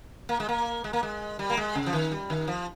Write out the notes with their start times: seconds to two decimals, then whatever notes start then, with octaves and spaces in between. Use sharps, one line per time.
0.29 A#3
0.40 G#3
0.49 A#3
0.84 G#3
0.93 A#3
1.03 G#3
1.39 G3
1.50 A#3
1.57 G#3
1.75 C#3
1.86 F3
1.93 D#3
2.12 G3
2.30 D#3
2.48 F3